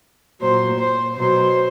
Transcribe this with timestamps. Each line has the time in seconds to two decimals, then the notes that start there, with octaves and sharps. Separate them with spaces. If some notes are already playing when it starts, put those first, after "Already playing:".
0.41 A#2 F#3 C5
0.79 C5
1.16 B2 F#3 C5